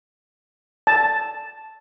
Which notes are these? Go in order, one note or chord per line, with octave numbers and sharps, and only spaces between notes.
A5